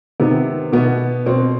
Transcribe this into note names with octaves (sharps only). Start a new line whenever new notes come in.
C3 D#3 B3
B2 B3
B2 C4